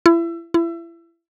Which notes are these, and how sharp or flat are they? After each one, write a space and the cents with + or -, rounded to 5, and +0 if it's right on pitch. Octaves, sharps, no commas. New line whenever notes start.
E4 +30
E4 +30